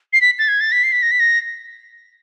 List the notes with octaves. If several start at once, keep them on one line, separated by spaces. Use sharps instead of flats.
C7
B6
A6
G#6
A6
B6
C7
B6
A#6
B6
A#6